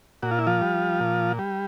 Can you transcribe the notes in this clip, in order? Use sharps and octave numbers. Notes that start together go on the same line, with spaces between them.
A#2 F#4
F4
E4
F3 F4
G3
A#2
G3